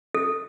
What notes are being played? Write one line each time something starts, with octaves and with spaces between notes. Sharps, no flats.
A4